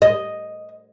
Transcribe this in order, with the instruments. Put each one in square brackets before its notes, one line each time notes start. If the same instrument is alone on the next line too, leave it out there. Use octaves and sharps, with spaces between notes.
[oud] D#5